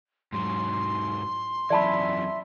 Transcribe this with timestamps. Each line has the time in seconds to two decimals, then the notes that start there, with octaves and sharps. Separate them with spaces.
0.33 G#2 F#3 C6
1.70 F#2 E3 D5 E5 A5 B5